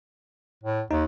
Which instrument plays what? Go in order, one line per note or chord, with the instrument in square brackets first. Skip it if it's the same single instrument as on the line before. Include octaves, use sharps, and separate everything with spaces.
[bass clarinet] A2
[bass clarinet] D#2 [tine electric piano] D#4